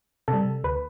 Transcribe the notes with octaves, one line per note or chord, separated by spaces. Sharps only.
C3 A4
G3
D2 B4